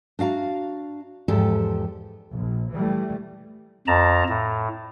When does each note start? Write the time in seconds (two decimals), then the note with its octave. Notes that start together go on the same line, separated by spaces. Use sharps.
0.19 D4 F#4 F5 A#5
1.28 E2 G#2 F3 G4 A4
2.33 A#1
2.74 E3 G3 A3
3.87 F2 A5 A#5
4.29 A2